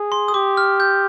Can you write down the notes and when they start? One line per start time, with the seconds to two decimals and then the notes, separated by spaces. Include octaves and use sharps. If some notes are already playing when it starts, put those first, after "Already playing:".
Already playing: G#4
0.12 C6
0.28 D#6
0.34 G4 D6
0.57 F6
0.80 G6